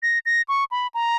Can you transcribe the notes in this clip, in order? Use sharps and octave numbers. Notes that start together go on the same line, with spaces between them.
A#6
A#6
C#6
B5
A#5